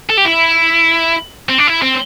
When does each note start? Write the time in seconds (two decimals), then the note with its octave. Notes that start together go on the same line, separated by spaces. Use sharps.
0.10 A4
0.17 G4
0.25 E4
1.49 C4
1.58 D4
1.67 E4
1.82 C4